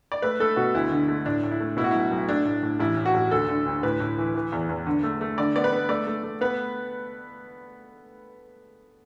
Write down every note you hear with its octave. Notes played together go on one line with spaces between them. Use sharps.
D5
A3 B4
A3 A4
B2 F#4
D2 E4
D3
A3
A2 D4
A2
E4
A3
B2 E4
F#4
B1 E4
B1
A3 D4
A2
A2
A1 E4
A2
F#4
A1
D2 A4
D3
D2
A2 B4
A2
E3
E3
E2
E2
D3
A3
A3
D3 D5
B3 D5
B4
B3
A3 D5
A3
A3
B3 B4